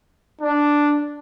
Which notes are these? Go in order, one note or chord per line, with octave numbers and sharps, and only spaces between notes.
D4